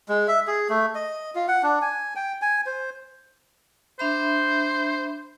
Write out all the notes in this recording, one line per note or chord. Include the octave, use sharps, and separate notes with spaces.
G#3
E5
G#4
A3
D#5
F4
F#5
D4
G#5
G5
G#5
C5
D4 C5 E5 B5